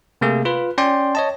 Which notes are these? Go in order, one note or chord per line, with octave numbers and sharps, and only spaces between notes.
C3 A3 A#3 G#4
F4 B4
C#4 D5 G5 C6
C#5 D#5 A5